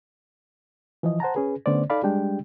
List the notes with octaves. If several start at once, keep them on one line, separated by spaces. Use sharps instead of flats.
E3 F3 E4 D#5
C5 F#5 A5 A#5
C#4 G#4 B4
D3 A3 B3 C#4 C5 D5
D#4 A4 D5 F5 B5
G3 G#3 D4 G4 G5